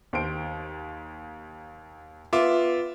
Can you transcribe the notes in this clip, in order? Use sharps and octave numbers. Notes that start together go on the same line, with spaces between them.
D#2 C5 D7
B3 F4 E5 D6